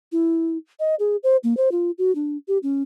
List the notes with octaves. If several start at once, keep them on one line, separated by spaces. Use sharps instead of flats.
E4
D#5
G#4
C5
A#3
C5
F4
F#4
D4
G4
C#4